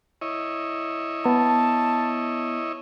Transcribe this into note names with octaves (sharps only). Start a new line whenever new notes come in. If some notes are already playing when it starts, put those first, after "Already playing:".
E4 C#5 D#5
B3 A5